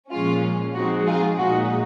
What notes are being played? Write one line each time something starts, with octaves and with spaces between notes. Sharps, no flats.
A#2 F3 G#3 C#4 F4
F3 G#3 C4 D#4 F#4
F4 G#4
A#2 G#3 D#4 F#4